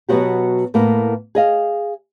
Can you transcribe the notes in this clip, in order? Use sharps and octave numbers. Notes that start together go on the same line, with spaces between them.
B2 F#3 B3 C4 F#4 G4
A2 A#3 B3
G#4 D#5 F5